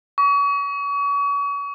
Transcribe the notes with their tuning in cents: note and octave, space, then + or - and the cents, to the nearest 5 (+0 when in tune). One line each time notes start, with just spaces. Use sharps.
C#6 +40